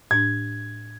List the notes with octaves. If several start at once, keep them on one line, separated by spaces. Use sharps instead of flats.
A2 D4 G#6